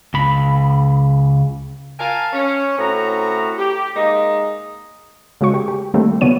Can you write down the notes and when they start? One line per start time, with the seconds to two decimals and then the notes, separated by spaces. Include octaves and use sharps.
0.14 C#2 B5
2.00 A#4 F5 G#5 A5
2.33 C#4
2.78 A2 C4 C#4 F#4 A#5
3.58 G4
3.95 G#3 A#3 D#4 D#5
5.41 C#3 G#3 F#4 C#6
5.54 G4
5.68 G4
5.94 D#3 G3 A3 A#3 C4
6.21 C3 F3 B3 C#5 D#7